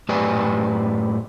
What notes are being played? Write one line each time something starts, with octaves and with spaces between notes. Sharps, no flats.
F#2 A2 G4 B4 D5 G#5